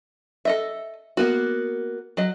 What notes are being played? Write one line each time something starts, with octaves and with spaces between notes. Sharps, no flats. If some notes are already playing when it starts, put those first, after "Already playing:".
A4 D#5 E5
A#3 B3 F#4
F#3 D#5